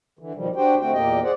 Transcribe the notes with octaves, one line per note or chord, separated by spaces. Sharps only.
D3 E3
B2 D#3 F3 G3
D4 F#4 G4 C5 G5
D3 A3 C4 F#4 G5
E2 A#2 A#3 G4 D#5 G5
G#4 C5 D5 F#5